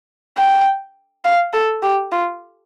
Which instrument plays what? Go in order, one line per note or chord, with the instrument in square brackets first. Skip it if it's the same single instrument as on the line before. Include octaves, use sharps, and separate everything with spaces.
[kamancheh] G5
F5
A4
G4
F4